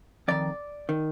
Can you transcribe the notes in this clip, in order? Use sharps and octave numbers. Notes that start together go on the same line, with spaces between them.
F2 D#3 D5
D#3